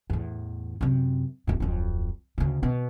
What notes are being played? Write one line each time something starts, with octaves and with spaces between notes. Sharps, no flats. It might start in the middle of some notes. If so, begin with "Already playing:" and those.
E2 A2
F#2 C3
D1 A2
D1 F2
D2 C#3
B2